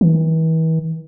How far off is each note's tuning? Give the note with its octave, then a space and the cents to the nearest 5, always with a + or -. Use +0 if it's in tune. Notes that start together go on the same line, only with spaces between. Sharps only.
E3 -40